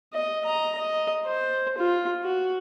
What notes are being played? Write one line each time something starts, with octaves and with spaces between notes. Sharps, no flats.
D#5
D#5 A#5
D#5
C5
F4
F#4